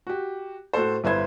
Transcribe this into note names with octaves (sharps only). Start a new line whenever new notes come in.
F#4 G4
A2 F#4 A4 C5
G1 E4 B4 C5 G#6